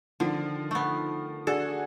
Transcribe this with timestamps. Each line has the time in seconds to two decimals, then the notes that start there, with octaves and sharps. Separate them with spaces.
0.20 D3 D#3 F3
0.71 A3 B3
1.47 D4 F#4 G#4 A4